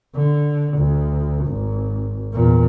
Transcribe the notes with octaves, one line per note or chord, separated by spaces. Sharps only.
D3
D2
G#1
E2 A#2